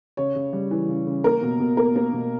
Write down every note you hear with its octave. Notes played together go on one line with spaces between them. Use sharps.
C#3 C#5
C#3
G3
E3
C#3
C#3
A#3 A#4
B2
B2
A#3 A#4
A#3
B2